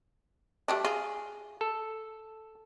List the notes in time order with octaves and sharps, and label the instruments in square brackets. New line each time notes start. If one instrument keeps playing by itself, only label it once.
[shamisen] G3 A3 D4
[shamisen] F4 [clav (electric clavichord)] G#4
[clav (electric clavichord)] A4